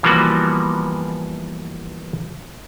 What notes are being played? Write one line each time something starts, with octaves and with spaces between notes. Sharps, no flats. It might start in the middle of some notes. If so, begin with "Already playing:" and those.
E3 F3 G3 A#3 B3 F#4